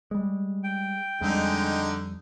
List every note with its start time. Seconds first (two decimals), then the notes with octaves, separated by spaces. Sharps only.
0.11 G3 G#3
0.64 G5
1.21 F2 D3 G3 G#3 D#4